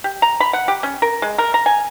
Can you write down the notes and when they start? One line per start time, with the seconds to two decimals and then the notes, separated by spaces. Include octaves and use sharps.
0.04 G4
0.22 A#5
0.40 B5
0.53 F#5
0.68 G4
0.83 C#4
1.02 A#4
1.22 G#3
1.38 A#4
1.54 A#5
1.66 G#5